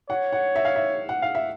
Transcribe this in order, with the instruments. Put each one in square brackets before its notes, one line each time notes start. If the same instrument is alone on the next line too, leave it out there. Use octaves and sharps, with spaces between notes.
[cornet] C#5 [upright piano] F#5
[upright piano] F#5
E5
F5
E5
F#5
F5
E5